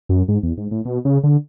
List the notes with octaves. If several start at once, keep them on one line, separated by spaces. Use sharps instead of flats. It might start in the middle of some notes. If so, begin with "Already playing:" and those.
F#2
G#2
E2
G#2
A2
B2
C#3
D3